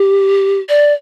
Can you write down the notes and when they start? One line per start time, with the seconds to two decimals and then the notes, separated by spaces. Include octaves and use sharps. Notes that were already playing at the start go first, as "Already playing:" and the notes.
Already playing: G4
0.69 D5